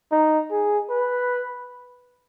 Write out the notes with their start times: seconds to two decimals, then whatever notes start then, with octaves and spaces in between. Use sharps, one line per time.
0.11 D#4
0.51 G#4
0.90 B4